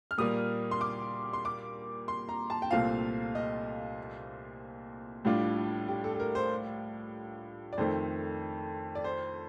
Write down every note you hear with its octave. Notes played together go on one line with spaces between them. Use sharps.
F6
A#2 G3 A#3 D#6
C6
D6
C6
D6
C6
A#5
A5
G5
C2 A#2 A3 C4 F4 F5
D#5
A2 G3 D4 F4
G4
A4
A4
A#4
C5
D5
F2 D#3 A3 C5
D5
C5